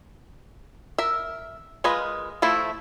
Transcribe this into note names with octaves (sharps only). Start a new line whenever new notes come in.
A#4 E5
G#3 F4 A#4 B4 D#5
F3 A3 E4